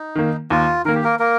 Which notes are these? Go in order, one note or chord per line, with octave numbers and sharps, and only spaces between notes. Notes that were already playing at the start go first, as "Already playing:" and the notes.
Already playing: D#4
D#3 A#3
D#2 F4
D#3 A#3 A#4
G4
A#3 A#4
A#3 A#4